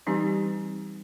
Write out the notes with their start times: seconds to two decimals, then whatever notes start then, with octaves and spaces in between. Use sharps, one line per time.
0.07 E3 G3 C4 D#4 G4